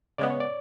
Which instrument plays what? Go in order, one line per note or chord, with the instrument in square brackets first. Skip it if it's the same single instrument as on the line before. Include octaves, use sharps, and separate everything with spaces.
[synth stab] C#3 G#3 B3 [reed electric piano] D5
[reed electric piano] C#5
D5